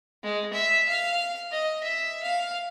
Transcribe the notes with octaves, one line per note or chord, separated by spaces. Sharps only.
G#3
E5
F5
D#5
E5
F5